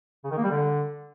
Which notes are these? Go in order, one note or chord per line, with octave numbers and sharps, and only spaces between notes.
C#3
D#3
A#3
G3
D3